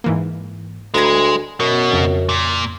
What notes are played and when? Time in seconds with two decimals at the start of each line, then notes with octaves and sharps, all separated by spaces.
0.04 G#2 E3 A#3
0.94 D2 G#3 A#5 B5 G#6
1.60 F#2 B2
1.91 F2 C#3
2.29 A#2